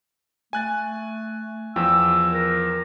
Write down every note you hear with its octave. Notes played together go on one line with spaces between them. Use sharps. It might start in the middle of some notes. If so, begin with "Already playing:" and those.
A3 G#5 F#6 A6
E2 F3 G5 E6
A#4